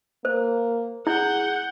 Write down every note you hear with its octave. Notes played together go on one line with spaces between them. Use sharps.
A#3 C5
E4 G#4 F#5 G6